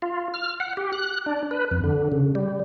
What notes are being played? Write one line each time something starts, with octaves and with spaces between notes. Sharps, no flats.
F4
F6
F#5
G4
F#6
D4
B4
F2
D3
C#3
G3